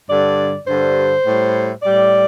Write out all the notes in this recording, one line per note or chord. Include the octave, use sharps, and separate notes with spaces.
G2 D3 G3 D5
G2 D3 G3 C5
A2 G3
A2 G3 D5